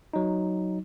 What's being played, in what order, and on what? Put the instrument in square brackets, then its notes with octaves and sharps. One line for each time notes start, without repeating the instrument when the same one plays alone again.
[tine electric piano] F#3 D#4